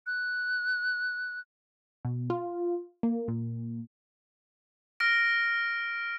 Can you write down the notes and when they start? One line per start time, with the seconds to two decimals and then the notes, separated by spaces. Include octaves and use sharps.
0.07 F#6
2.05 B2
2.30 F4
3.03 A#3
3.28 A#2
5.00 F6 A#6 D7